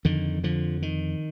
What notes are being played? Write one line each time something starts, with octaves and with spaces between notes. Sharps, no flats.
F2 D3 D#3
D3 F3
D#3